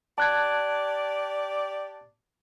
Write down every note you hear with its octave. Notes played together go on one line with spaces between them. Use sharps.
G4 D5 A5 F#6 G#6